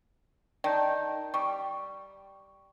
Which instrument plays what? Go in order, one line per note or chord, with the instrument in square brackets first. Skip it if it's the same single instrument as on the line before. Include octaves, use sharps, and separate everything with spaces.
[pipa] D#3 [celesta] D5 A5 G6
[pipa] G3 [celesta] C#6